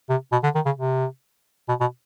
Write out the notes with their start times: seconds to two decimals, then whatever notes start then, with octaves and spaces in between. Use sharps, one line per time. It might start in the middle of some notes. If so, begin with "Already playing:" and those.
0.09 C3
0.32 B2
0.44 D3
0.55 D#3
0.66 C#3
0.78 C3
1.69 B2
1.81 B2